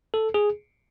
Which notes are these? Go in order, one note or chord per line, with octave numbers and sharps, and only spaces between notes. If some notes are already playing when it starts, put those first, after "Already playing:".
A4
G#4